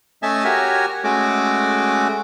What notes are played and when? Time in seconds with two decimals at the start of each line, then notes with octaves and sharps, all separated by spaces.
0.23 A3 C#4 D#5 E5 G#5 A5
0.44 F#4 G4 A#4 C#5 G#5
1.04 G#3 A3 C#4 F#4 D6